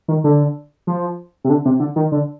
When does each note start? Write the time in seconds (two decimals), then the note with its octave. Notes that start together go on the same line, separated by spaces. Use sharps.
0.08 D#3
0.24 D3
0.87 F3
1.44 C3
1.50 D3
1.65 C3
1.80 D3
1.96 D#3
2.12 D3